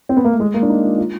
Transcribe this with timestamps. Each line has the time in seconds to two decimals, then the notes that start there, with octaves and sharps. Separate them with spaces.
0.09 C4
0.17 B3
0.24 A#3
0.33 A3
0.40 G#3
0.54 A#3
0.62 D4
0.70 D#4
0.84 F4
0.98 F4